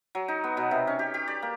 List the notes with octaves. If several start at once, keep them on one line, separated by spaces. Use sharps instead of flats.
F#3
D#4
B3
B2
C3
C#4
G4
G4
D5
A#3